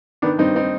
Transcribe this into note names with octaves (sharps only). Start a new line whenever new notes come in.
D#3 B3 D4
G2 C4 D#4
C4 D#4